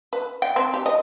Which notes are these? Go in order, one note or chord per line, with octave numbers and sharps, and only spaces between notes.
B4
G5
C4
G4
D#5